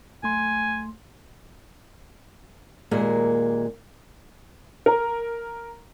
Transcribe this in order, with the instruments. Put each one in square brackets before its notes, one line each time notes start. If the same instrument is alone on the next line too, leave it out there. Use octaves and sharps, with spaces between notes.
[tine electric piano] B1 A3 C6 [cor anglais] G#5
[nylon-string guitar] D#2 A#2 G#3 A#3 A#4
[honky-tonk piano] A#4